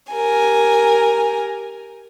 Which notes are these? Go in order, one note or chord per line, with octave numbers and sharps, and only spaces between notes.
G4 A#4 G#5